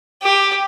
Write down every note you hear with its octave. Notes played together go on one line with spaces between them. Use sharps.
G4